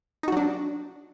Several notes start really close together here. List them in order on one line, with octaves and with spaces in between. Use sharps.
D#4 F#4 F#3 D4